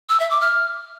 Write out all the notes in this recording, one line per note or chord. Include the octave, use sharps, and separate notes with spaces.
E6
E5
D6
F6